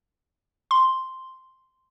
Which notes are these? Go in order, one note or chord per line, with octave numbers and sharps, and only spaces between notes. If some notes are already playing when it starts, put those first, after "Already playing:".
C6